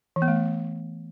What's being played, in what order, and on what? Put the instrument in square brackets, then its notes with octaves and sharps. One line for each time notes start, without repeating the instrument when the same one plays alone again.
[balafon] E3
B3
A3